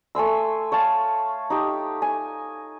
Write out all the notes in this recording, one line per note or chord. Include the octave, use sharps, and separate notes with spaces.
A3 G#5 C6 E6
C#5 F5 A5
D#4 G4
G#5